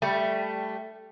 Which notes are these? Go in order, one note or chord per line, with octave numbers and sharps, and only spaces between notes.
G3 A3